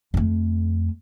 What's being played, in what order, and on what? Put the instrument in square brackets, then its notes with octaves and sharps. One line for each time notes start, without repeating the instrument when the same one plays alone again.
[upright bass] F2 A3